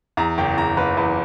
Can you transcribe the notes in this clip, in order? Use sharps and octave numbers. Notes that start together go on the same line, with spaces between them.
E2 A#5
F#1 G5
E2 A#5
F#1 B4
E2 B4